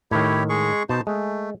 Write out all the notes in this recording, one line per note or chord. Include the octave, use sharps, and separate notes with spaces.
A2 D#3 E4 G4 C#5
G#3 G#4 C#6
B2 D#4 C5 A5
G#3 A3